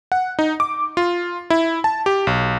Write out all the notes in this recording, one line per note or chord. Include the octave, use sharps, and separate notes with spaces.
F#5
D#4
D6
F4
E4
A5
G4
B1